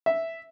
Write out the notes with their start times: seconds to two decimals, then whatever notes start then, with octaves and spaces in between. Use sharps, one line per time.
0.06 E5